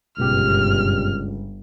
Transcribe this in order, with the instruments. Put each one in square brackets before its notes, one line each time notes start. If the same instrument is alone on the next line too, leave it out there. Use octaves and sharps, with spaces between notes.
[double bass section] G1 [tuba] C#2 [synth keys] F#2 B2 G4 [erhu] F6